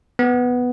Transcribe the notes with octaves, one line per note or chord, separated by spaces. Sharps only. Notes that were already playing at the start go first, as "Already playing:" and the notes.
B3